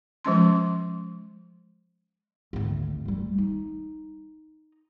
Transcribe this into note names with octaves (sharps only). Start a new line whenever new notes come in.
F3 G#3 C#4 C6
G#1 D2
G3 A3
D#4